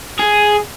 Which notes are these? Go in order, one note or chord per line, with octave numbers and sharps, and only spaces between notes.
G#4